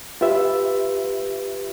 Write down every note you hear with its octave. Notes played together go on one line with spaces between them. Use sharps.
F4 G4 B4 E5